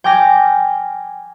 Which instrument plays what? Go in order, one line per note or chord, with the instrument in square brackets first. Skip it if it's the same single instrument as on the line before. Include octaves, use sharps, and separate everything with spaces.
[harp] G5 G#5 D6 F6 A#6